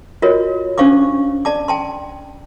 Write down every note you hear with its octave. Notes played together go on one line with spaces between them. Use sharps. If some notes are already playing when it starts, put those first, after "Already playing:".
F4 F#4 A#4 C#5 D#5
C#4 D4 C5 F5 C#6 D6
D5 A5 D6
G5 A5 C6